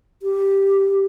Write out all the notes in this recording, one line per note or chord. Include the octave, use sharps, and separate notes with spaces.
G4